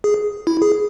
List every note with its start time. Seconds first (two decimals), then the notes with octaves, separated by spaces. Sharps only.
0.04 G#4
0.47 E4
0.62 G#4